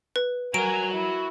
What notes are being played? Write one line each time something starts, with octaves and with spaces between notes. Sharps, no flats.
B4
F#4 A#4 G#5 A#5 D7
E4